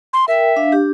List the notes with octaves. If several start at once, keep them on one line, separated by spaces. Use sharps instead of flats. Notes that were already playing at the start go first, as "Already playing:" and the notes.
C6
A#4 E5 G5
D4 F5
D4 G4